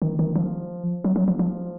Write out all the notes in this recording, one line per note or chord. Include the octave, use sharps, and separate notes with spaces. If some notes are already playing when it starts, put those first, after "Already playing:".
D#3
D#3
F3
F#3
F#3
F3
F3